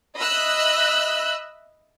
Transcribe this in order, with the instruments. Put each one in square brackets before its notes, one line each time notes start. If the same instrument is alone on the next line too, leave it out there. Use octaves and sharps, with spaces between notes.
[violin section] D#5 E5 B5 E6 F#6